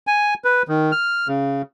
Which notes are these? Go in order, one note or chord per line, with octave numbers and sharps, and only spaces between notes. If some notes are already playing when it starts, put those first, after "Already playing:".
G#5
B4
D#3
F6
C#3